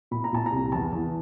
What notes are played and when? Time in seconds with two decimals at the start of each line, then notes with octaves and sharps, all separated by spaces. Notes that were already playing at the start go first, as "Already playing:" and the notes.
0.11 A#2 B5
0.24 A#5
0.33 A#2 A5
0.46 A#5
0.52 C2
0.72 E2 A5
0.92 E2